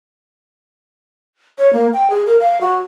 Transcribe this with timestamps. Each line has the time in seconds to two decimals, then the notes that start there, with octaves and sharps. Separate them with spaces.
1.58 C#5
1.73 A#3
1.93 G5
2.10 G#4
2.26 A#4
2.40 F5
2.61 F#4